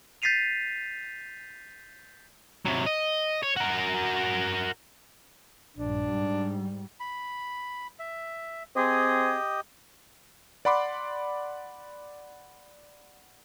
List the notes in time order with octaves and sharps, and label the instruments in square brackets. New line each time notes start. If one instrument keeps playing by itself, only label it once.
[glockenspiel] G6 A6 B6 C7 D#7 F7
[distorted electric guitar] C3 F#3
D#5
C#5
F#4 A#4
[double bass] A#1 G2 [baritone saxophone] D4
[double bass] G#2 G3
[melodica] B5
E5
[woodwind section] C4 G#4 [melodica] G4 D#5
[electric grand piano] D5 F#5 B5 C6 D6